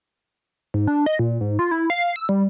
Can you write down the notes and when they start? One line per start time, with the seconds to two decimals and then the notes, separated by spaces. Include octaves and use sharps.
0.74 G#2
0.88 D4
1.06 D#5
1.19 A#2
1.41 G#2
1.59 F4
1.71 E4
1.90 F5
2.16 E6
2.29 G3